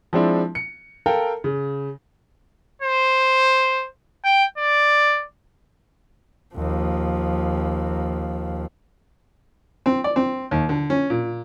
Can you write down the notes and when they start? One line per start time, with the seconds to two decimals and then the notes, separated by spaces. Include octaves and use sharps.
0.13 F3 G#3 C4 D4 E4
0.55 C#7
1.06 A4 A#4 F5 G5
1.44 C#3
2.82 C5
4.25 G5
4.58 D5
6.55 D#2 F3
9.86 C4
10.04 D5
10.16 C4
10.51 D#2
10.69 D3
10.90 C#4
11.10 A#2